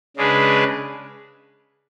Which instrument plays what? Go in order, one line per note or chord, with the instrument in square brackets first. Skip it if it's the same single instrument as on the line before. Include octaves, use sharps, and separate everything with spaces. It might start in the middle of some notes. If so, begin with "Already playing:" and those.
[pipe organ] C#3 G#3 D4 G#4 B4